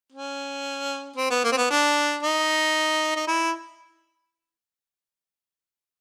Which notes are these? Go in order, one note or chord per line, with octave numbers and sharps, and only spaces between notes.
C#4
C4
B3
A#3
C4
B3
D4
D#4
D#4
E4